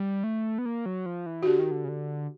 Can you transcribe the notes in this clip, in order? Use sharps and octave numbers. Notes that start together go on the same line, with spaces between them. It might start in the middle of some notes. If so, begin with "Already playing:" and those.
Already playing: G3
A3
B3
A#3
F#3
F3
E3
F#4
D3 G4
D#3
D3
C#3
D3